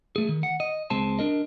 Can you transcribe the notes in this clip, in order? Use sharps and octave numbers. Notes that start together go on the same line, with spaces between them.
A3 G#4
D#3
F#5
D#5
C#2 G#3 C4 C5 A5
D4 A#4 D#5